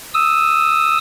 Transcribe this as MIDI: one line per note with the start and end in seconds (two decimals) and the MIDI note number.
0.14 0.98 87
0.14 0.98 88